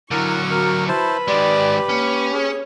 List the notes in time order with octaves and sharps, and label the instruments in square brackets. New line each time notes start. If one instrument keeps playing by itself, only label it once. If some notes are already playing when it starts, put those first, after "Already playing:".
[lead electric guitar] D3 F#3 [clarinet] E4 [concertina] A#4 [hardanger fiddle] C#6
[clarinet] F#4 [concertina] A#4
[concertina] E4 C5 A5 [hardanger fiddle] B4
[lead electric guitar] D#3 G#3 [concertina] G4 [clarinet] D5
[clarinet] A#3 [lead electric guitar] C#4
[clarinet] G#4 [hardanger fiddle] C#5